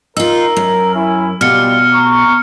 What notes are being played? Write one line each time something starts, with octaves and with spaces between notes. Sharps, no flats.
D#4 F4 A#4 E6
F#2
C#4 E4
B2 G3 F4 G4 F6 C#7
A#5 C#6